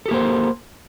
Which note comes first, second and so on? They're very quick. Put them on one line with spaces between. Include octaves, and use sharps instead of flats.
A4 G4 A#3 C5